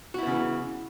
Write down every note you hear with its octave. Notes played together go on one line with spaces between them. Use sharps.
C#3 E3 B3 E4 F#4